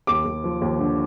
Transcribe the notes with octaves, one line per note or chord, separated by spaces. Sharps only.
D#2 D6
D#2
F3
D#2
D3